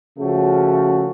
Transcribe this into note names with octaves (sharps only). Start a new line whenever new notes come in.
C#3 F3 A3 C#4 F#4